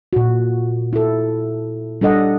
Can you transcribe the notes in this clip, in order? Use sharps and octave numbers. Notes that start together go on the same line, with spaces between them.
A#2 F#4
E4 A4
G3 D4 A4 D#5 F#5